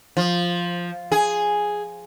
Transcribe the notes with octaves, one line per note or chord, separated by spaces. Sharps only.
F3
G#4